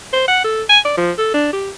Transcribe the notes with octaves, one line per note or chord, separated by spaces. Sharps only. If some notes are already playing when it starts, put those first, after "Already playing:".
C5
F#5
A4
G#5
D5
F3
A4
D4
G4